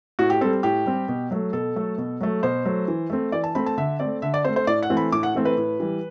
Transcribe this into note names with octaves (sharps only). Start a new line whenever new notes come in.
A2 F#4
G4
G3 C4 A4
A2 G4
G3 C4
B2
F#3 A3
B2 A4
F#3 A3
B2
F#3 A3
B2 C5
F#3 A3
E3
A3 C4
E3 D5
A5
A3 C4 B5
A5
D3 E5
A3 C4 D5
D3 E5
D5
A3 C4 C5
C5
A2 D5
F#5
E3 A3 C4
B5
A2 D6
F#5
E3 A3 C4
B4
A2
E3 G3